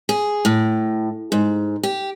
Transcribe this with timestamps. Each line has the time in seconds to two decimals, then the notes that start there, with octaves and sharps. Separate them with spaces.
0.09 G#4
0.45 A2
1.32 G#2
1.83 G4